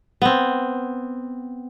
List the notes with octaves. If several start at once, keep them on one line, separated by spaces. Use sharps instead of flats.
B3 C4